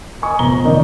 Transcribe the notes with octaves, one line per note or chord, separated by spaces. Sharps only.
D#5 G#5 C#6 D#6
F1 B3 A#5 G7
D#3 A#3 C#4 D#4 D5 D#5